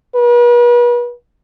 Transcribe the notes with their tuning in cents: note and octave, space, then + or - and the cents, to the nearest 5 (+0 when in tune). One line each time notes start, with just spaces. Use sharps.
B4 -40